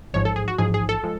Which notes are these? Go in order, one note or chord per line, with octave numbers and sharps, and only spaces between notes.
A1 G#2 F3 C#5
A4
G#4
F#4
A1 G#2 F3 G#4
G#4
A4
F3 G#3